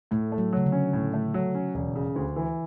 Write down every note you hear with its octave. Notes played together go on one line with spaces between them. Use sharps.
A2 A3
A3
F#3
C#3 F#3
D3
C#4
A2
A3
F#3
C#4
E1
C#3
D2
E3